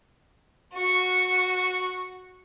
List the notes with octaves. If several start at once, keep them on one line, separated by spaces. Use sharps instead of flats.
F#4 C#6